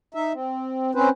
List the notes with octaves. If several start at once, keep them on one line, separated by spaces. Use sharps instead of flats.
D#4 E5
C4
C4 C#4 B4 C5